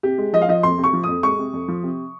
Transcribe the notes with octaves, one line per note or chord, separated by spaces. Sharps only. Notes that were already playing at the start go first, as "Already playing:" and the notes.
C3 G4
G#3
F3 D#5
F5
F3 D#5
F2 C6
C3
C#6
F3
F2 D#6
G#3 C#6
C3
F2
F3
C3